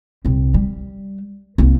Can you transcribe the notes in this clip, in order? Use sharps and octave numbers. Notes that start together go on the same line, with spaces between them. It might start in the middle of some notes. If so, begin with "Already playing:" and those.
C2 C3
G3
C2 A#3